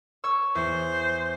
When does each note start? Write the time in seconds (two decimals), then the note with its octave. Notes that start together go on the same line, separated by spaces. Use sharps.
0.24 C#5 C#6 E6
0.55 E2 C5